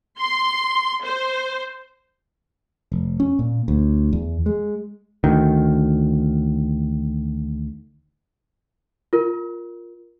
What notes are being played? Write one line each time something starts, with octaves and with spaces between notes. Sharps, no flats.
C6
C5
F1
C#4
A#2
D2
E2
G#3
D2 D#3
F4 A#4